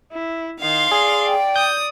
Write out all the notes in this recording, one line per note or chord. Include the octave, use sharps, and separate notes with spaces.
E4
D#3 F5 C6
G#4 D5
G5
D#6 G6